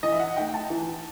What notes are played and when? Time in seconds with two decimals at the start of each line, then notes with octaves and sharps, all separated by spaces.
0.03 E3 D#5
0.12 E5
0.20 F#5
0.36 A3 D#4 G5
0.54 A5
0.70 E3